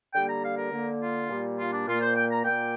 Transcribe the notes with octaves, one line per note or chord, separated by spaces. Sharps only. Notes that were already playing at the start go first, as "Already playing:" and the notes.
D3 G3 A#3 G5
A#5
F5
A#4
D3 A#3
F4
A#2 G3 A#3
F4
D4
A#2 A#3 F4
C5
G5
A#5
A#2 A#3 G5